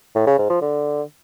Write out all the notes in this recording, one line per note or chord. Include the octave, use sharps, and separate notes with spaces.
A2
C#3
G#2
F3
D3